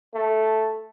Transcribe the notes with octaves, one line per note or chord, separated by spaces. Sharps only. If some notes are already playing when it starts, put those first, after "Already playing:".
A3